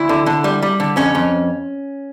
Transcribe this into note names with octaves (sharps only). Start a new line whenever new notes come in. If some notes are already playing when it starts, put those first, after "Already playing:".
Already playing: D2 E4
D3
D3
G3
G3
D3
F2 C#4
F2